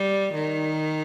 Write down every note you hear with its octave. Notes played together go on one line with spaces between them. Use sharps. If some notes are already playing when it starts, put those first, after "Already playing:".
Already playing: G3
D#3